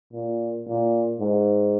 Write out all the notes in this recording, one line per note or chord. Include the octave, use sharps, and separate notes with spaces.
A#2
A#2
G#2